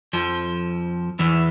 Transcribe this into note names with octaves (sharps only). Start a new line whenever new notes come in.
F2 F3
E2 E3